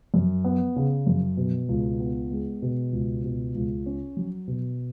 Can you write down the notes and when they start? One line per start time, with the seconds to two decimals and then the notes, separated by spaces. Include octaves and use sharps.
0.14 F#2
0.44 B3
0.76 C#3
1.07 F#2
1.37 B2
1.69 C#2
2.00 B3
2.31 G#3
2.62 B2
2.93 C#2
3.24 B2
3.55 C#2
3.86 C#4
4.17 F#3
4.47 B2